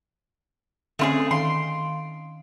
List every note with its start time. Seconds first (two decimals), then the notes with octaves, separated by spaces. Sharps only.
0.99 D3 A3 C4 C#4 F4 G#4
1.31 D#3 F5 C6 D7